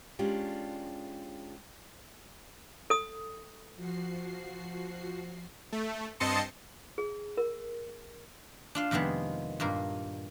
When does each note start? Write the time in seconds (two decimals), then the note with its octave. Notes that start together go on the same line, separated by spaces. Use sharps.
0.19 G#3 C#4 D4 F4 G4
2.90 A4 D#6
3.77 F3 F#4 C7
5.72 A3
6.20 G2 C4 D#5 A5 C6 C#7
6.98 G#4
7.37 A#4
8.75 D4 F4 F5
8.91 F2 C3 D#3 G#3 B3
9.60 G2 A#2 A#3 A#4